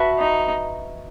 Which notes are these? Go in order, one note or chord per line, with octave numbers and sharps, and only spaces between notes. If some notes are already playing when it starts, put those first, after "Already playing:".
Already playing: F#4 B4 E5 A5
D#4